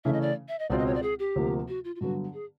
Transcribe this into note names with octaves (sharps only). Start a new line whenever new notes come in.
C#3 E3 A3 C#4 E5
D#5
D5
E5
D#5
C#2 B2 G#3 C4 F4 D5
D#5
C#5
D5
G#4
G4
D2 C3 F3 A#3
F#4
F4
F4
G2 D3 F#3 B3 F#4
G#4